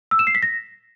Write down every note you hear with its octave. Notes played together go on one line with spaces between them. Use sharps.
E6
E7
C7
B6
A#6